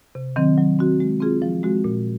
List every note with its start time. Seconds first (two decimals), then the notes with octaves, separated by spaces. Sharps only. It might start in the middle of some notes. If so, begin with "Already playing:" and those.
0.15 C3
0.36 D#3 F#3 C4
0.58 F#3
0.79 C4 F#4
1.00 G#3
1.21 C4 F4 G#4
1.42 F3
1.63 G#3 C4 F#4
1.84 A#2